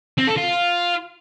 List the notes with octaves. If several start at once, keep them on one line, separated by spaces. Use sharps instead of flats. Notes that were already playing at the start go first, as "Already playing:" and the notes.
C4
A4
F4